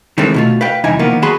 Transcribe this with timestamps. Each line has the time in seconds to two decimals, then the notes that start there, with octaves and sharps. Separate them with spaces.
0.18 D#3 E3 G#3 A3 C4
0.34 B2 A3 F4
0.61 B4 F5 G5
0.84 C2 F2 E3 D#4 E4 G#5
0.99 D#3 F3 A#3 B3
1.22 B3 F#4 G#4 A5 B5 C6